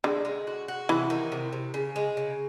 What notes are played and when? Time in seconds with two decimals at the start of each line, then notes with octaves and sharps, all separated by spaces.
0.04 D3 G#3
0.25 G#3
0.47 F#4
0.68 F#4
0.89 C3 E3
1.10 D#3
1.32 C3
1.52 C3
1.74 C#3
1.96 G#3
2.17 C#3